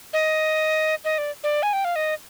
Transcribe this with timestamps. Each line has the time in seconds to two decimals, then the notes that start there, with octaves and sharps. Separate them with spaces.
0.13 D#5
1.04 D#5
1.18 D5
1.44 D5
1.63 G#5
1.73 G5
1.85 F5
1.96 D#5